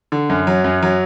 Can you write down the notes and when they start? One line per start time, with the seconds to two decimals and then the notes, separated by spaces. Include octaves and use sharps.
0.12 D3
0.30 F#2
0.47 F#3
0.64 F#2
0.82 F#3